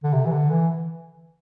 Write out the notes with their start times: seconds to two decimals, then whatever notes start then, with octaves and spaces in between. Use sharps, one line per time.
0.04 D3
0.13 C3
0.26 E3
0.32 D3
0.50 E3